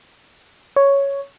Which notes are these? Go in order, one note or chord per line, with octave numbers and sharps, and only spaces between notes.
C#5